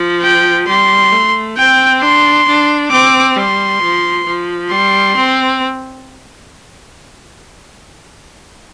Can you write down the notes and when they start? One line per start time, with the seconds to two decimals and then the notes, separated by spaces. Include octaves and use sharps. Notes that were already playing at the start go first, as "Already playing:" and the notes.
Already playing: F3
0.22 G5
0.68 G3 C6
1.12 A3
1.57 C4 G5
2.02 D4 C6
2.47 D4
2.91 C4 D6
3.36 G3 C6
3.81 F3
4.25 F3
4.70 G3 C6
5.16 C4